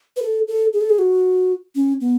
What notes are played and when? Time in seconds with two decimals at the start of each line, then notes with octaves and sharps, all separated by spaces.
0.17 B4
0.22 A4
0.48 A4
0.73 G#4
0.81 A4
0.90 G#4
0.99 F#4
1.75 C#4
2.01 B3